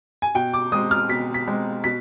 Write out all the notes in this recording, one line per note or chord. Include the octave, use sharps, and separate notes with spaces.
G#5
B2 G5
D6
G#3 C4 D#6
F6
B2 B6
B6
G#3 C4
B2 B6